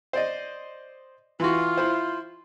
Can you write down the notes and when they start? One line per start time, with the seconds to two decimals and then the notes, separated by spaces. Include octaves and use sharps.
0.13 C5 D5 D#5
1.40 E3 F4 F#4
1.77 E4 C5